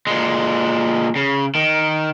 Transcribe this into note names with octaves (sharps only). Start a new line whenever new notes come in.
A#2 G#3
C#3
D#3